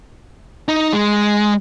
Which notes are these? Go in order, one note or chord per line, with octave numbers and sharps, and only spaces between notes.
D#4
G#3